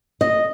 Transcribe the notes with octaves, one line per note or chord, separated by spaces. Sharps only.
D#5